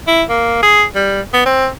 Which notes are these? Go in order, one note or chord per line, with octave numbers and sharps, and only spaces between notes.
E4
A#3
G#4
G3
B3
C4